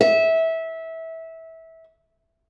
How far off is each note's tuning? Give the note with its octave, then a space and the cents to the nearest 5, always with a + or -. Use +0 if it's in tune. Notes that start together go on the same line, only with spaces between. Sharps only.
E5 -20